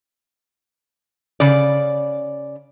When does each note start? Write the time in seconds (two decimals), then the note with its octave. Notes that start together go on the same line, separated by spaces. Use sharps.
1.40 C#3 D5